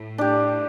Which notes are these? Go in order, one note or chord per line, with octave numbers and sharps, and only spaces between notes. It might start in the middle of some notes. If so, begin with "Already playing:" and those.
Already playing: A2
D4 G4